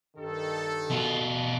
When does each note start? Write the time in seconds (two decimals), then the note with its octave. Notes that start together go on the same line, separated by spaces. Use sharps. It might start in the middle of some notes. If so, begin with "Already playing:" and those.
0.17 G2 D#3 A4
0.91 B2 F4